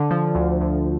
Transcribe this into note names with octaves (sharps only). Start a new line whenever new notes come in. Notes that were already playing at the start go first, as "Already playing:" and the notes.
Already playing: D3
F3
D2
D2